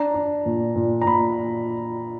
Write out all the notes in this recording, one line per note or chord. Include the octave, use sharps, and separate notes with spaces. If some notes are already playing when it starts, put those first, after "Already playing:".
Already playing: D4 A#5
D4
A#2
A#2
A#5
A#2 B5